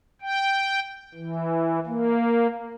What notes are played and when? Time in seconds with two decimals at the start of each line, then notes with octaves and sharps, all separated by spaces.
0.22 G5
1.15 E3
1.86 A#3